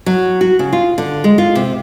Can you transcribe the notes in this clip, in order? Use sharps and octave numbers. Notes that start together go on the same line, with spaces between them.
F#3
F#4
C#3
F4
D3
G#3
F4
C3